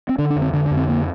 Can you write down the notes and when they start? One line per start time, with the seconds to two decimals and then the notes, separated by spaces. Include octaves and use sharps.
0.09 C4
0.19 D3 D4
0.30 D4
0.36 F2
0.42 C4
0.53 D3 D4
0.66 D4
0.71 F2
0.77 C4
0.89 D3 A#3